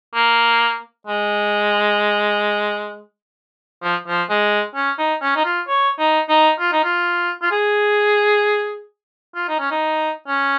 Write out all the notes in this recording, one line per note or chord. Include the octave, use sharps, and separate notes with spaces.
A#3
G#3
F3
F3
G#3
C#4
D#4
C#4
D#4
F4
C#5
D#4
D#4
F4
D#4
F4
F4
G#4
F4
D#4
C#4
D#4
C#4